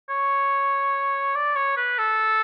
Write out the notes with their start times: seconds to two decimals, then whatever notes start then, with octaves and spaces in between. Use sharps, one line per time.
0.09 C#5
1.35 D5
1.56 C#5
1.77 B4
1.98 A4